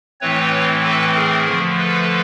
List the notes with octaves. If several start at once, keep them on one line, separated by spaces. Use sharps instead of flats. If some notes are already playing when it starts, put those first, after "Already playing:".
A2 E3 A3 C4 B4 C#5
A4 B4
G#4 A#4
D3 F3 A3
A4 B4